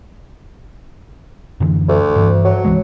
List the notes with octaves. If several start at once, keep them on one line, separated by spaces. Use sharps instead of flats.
F#2 D3 E3
D2
G2 E3
F#3
C2 E3 G#3